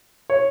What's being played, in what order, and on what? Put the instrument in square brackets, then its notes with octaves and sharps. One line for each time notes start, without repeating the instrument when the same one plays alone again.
[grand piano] C#5